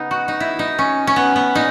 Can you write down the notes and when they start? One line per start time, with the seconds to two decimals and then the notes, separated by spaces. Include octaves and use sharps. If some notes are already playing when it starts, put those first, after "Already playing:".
Already playing: C#3 B3 D#4
0.11 F#4
0.28 D#4
0.40 E4
0.59 D#4
0.79 C#4
1.07 C#4
1.16 B3
1.36 B3
1.55 A#2 D#4